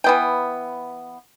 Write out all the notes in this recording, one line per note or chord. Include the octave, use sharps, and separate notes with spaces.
E3 B3 G5